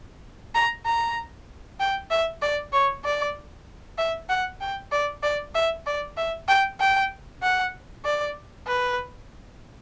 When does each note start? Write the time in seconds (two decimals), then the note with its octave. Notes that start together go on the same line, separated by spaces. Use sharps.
0.55 A#5
0.86 A#5
1.80 G5
2.11 E5
2.42 D5
2.73 C#5
3.05 D5
3.98 E5
4.30 F#5
4.61 G5
4.92 D5
5.23 D5
5.55 E5
5.86 D5
6.18 E5
6.48 G5
6.80 G5
7.43 F#5
8.05 D5
8.67 B4